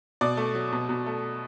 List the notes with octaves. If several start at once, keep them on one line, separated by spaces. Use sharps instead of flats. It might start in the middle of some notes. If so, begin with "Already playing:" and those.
B2 D5
A3
F#3
B2
B2
A3